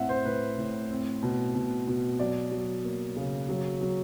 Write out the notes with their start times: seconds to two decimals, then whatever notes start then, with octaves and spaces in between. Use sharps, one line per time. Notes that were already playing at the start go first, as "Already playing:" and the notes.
Already playing: A2 C4 E5 F#5
0.09 C5
0.25 A2 B4
0.58 A2
0.91 C4
1.23 B2
1.54 B2
1.87 B2
2.19 F#3 D5
2.52 F#3
2.85 A#3
3.17 C#3
3.49 F#3
3.81 F#3